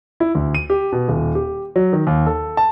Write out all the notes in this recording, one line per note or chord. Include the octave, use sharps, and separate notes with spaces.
E4
D2
D#7
G4
B2
D#1
G4
F#3
D#3
D#2
A4
A5